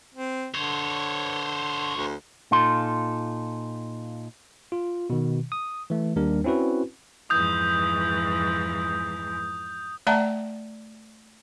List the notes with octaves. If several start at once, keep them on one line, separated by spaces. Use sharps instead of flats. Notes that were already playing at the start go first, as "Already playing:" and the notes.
C4
D3 C5 C#5
D2
A#2 D#4 F4 A4 C6
F4
B2 D#3
D#6
E3 A3
D#2 G3 D4 A#4
C4 C#4 E4 F#4 B4
F2 G#2 E3 D#6 G6
A3 D5 E5 F#5 A5 A#5